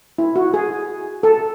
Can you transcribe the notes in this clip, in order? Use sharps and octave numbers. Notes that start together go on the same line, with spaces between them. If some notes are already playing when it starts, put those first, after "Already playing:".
E4
F#4
G#4
A4